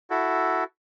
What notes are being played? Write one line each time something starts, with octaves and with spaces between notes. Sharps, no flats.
E4 F#4 A4